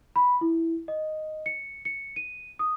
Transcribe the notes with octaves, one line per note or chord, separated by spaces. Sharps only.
B5
E4
D#5
C#7
C#7
D#7
D#6